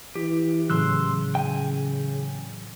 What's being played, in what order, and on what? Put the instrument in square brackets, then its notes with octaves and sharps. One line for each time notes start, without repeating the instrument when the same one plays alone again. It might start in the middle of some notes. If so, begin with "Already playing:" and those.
[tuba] E3 [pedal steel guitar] G4
[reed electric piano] A2 E3 F#3 [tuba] C#3 [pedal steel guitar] C6 E6 F#6
[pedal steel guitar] G5 G#5